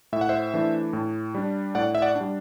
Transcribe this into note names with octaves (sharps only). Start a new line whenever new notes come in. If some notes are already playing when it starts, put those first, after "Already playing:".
A2 E5
F#5
C5 E5
E3 A3 D4
A2
G3 D4
A2 D5 F#5
E5
D5 F#5
D4
G3